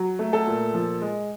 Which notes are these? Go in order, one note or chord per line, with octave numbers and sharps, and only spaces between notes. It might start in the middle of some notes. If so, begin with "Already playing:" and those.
Already playing: F#3
A3
A4
A#2
F3
G#3